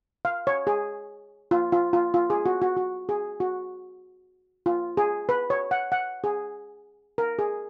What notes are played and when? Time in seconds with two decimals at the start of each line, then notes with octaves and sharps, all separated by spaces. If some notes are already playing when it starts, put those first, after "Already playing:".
0.25 F5
0.47 C#5
0.67 G#4
1.51 F4
1.72 F4
1.93 F4
2.14 F4
2.30 G#4
2.46 F#4
2.62 F#4
2.77 F#4
3.09 G#4
3.40 F#4
4.66 F4
4.97 G#4
5.29 B4
5.50 C#5
5.71 F#5
5.92 F#5
6.24 G#4
7.18 A#4
7.39 G#4